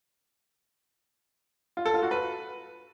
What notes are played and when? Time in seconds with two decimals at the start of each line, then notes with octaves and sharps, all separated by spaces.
1.77 F4
1.85 A4
1.94 F4
2.03 F#4
2.11 B4